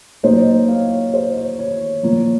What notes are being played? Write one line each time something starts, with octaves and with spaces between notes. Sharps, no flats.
A#2 F#3 A#3 D#4 C5 D#5
C#5 F5
C5 D#5
C#5
C#5
A#2 F3 A#3 C#5